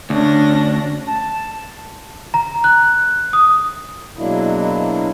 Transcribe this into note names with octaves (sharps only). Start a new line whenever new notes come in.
D2 C#4 D4 A#6
A5
A#5
F#6
D#6
B2 F#3 G#3 A#3 D4 E4